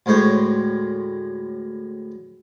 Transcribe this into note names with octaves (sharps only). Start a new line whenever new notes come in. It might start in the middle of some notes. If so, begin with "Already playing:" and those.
D2 A2 G#3 C5 C#5